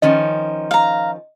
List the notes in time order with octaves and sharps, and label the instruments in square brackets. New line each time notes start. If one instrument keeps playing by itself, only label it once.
[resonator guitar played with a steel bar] D#3 F3 C#4 [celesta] D#5
[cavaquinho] F5 A#5